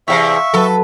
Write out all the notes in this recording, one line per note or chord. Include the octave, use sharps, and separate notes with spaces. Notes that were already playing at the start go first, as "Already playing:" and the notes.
E2 C3 E5 F5 G5 C#6 B6
F#3 A4 B4